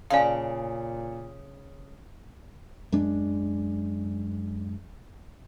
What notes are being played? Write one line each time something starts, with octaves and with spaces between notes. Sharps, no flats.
A#2 C#3 D5 F5 G#5 A5
F#2 G#3 D4